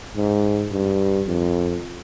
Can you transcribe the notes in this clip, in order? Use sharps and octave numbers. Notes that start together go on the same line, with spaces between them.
G#2
G2
F2